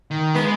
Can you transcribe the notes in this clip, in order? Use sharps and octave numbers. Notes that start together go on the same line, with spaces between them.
D#3
G#3 B3